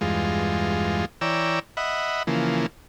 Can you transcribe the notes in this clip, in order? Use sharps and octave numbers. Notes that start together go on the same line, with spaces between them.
E2 G2 G#3 F4
E3 C#5 D5 G5 A#5 E6
D#5 E5 F#5 B5
C#3 E3 F3 A#3